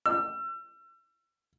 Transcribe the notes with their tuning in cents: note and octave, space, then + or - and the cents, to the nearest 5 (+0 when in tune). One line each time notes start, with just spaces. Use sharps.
E6 +35